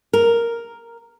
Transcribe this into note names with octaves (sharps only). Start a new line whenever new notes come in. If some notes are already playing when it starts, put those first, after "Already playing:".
A#4